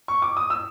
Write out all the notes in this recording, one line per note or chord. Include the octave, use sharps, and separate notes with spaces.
C#6
D6
D#6
E6